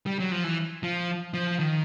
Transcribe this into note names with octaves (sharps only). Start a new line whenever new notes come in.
G3
F#3
F3
E3
F3
F3
D#3